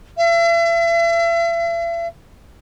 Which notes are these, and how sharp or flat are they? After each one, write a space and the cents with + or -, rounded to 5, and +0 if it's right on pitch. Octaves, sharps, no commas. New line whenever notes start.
E5 +40